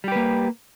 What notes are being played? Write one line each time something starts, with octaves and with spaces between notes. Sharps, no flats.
G3 A#3 G4 B4